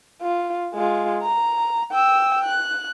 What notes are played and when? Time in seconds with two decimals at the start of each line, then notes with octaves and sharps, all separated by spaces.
0.22 F4
0.75 G#3 F4
1.23 A#5
1.91 G5 E6
2.45 F#6